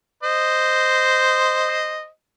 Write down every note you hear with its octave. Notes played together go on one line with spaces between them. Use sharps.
C5 D#5